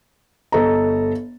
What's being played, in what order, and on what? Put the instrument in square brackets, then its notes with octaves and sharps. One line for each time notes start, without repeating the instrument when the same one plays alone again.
[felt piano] G1 A4 D#5 A#5